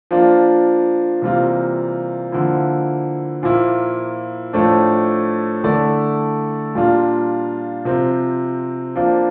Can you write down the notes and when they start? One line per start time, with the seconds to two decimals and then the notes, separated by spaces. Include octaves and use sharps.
0.11 F3 A#3 D4 F4
1.22 C3 E3 G3 A#3 F4
2.32 D3 F3 A#3 E4
3.43 A#2 F3 A#3 E4
4.53 A2 F3 A3 D4
5.64 D3 A3 E4 A4 D5
6.75 A#2 G3 A#3 D4 F4
7.85 C3 F3 C4
8.96 F3 A#3 D4